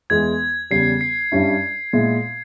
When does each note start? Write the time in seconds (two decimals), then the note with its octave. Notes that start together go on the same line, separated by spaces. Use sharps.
0.10 E2 E3 G#3 G#6
0.71 E2 C#3 G3 C7
1.01 C7
1.32 G2 G3 C#4 E4
1.93 A#2 G#3 E4